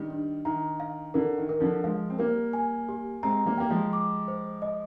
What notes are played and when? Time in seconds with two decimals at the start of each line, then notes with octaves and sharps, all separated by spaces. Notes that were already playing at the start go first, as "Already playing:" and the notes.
Already playing: D#3 G3 D4
0.10 D4
0.45 D#3 A#5
0.80 F5
1.14 D3 A#4
1.38 D#3
1.49 A#4
1.60 D3 F3
1.84 F3 G#3 F5
2.10 C4
2.19 G3 A#3 A#4
2.53 G#5
2.89 G4
3.23 G#3 C4 A#5
3.46 G3 A#3
3.58 A#3 G5
3.70 F3 G#3
3.93 D6
4.28 C5
4.62 D#5